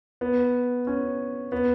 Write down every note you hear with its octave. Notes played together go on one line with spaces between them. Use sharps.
B3
C#4
B3